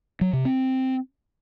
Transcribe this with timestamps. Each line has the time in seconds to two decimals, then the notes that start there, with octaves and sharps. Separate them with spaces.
0.21 F#3
0.33 C3
0.45 C4